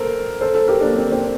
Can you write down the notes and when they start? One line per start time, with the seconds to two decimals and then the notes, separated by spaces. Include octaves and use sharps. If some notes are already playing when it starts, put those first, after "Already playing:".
Already playing: A4 A#4 C5
0.41 A4 C5
0.55 A4 C5
0.68 G4 A#4
0.81 A#3 D4
0.95 C4
1.12 C4